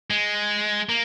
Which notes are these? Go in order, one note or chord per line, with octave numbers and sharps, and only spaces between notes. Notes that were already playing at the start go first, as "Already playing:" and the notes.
G#3
A#3